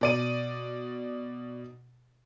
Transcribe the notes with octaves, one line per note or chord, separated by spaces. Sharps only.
B2 D5 D#7